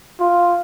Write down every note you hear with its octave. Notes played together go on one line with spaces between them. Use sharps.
F4